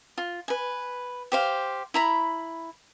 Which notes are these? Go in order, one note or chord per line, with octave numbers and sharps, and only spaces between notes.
F4
B4 G#5
G4 C5 F5
E4 A#5 B5